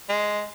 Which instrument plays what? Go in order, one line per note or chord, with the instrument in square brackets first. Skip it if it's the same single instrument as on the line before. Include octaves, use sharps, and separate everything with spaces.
[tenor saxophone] G#3